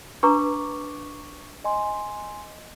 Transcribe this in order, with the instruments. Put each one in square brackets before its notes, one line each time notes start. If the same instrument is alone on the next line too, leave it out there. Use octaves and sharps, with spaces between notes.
[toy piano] D4 B4 A#5 [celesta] C#6 D6
[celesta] D#5 G#5 C6